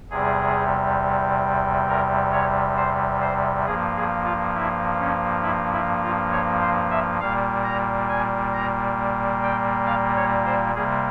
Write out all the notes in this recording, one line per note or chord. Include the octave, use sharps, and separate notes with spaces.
E2 C3 G3 G#4
A#4
C#5
C5
C5
G2 F3 A#3 G#4
G#4
F4
E4
C#4
E4
E4
F4
C#5
C5
E5
A#2 G3 A#3 F5
A#5
G#5
A#5
G5
F5
C#5
C5
C3 G3 A#3 G#4